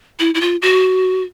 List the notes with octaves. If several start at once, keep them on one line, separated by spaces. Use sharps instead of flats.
E4
E4
F4
F#4